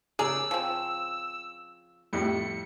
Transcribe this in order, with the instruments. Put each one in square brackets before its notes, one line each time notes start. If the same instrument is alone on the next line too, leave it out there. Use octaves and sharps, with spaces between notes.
[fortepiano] C#3 [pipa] G#4 A#4 D5 [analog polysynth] E6
[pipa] F3 C4
[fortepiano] F2 A2 G3 [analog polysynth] C#7